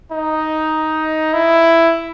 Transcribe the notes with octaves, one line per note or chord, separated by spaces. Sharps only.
D#4
E4